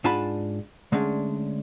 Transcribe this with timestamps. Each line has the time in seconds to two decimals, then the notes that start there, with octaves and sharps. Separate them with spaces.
0.04 G#2 D4 F4 G#5 A5 B5
0.92 D3 G#3 A3 C#4 D4